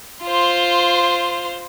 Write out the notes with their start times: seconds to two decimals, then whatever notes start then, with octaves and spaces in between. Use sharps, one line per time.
0.23 F4 C5